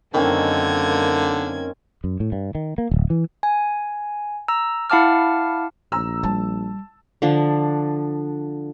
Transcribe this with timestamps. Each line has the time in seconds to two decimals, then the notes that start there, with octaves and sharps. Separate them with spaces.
0.14 F#2 D3 D#3 A#3 C4 C#4 G#6
2.04 F#2
2.20 A2
2.32 G2
2.55 D#3
2.78 A#3
2.91 D1
3.10 E3
3.43 G#5
4.48 A#5 E6
4.90 E4 F5 F#5 A5 D6 F6
5.92 A#1 A#5 E6
6.23 G3 A5
7.22 D3 F3 D4